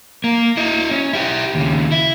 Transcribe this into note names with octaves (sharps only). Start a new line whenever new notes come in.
A#3
E4 D#5
C#4
E4 G4
D#2 C#3
E4